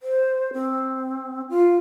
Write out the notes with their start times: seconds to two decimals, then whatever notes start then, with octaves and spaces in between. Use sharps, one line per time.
0.02 C5
0.53 C4
1.50 F4